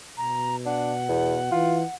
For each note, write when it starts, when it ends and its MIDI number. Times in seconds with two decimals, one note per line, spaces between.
0.17 1.52 47
0.17 0.56 82
0.66 0.93 62
0.66 1.95 78
1.09 1.37 40
1.52 1.83 52
1.52 1.79 65